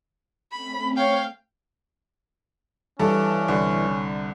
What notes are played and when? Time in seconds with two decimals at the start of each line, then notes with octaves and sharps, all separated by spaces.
0.52 A3 C4 C#4 B5
0.97 C#5 F5 G5
2.99 G2 E3 C#4 A4
3.48 C2 D3